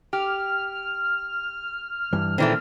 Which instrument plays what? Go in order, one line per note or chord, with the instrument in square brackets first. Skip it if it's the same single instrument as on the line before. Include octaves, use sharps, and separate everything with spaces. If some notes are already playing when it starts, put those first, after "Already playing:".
[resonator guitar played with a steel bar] G4 [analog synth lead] F6
[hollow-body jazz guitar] G2 E3
[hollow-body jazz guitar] A#2 C4 [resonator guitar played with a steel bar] D#3 E3 A3